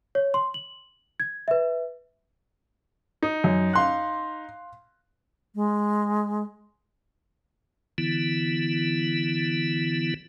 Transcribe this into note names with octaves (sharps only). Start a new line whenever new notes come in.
C#5
C6
F#7
G#6
B4 E5
D#4
F#2
F5 C6 F#6
G#3
D3 E3 B3 E4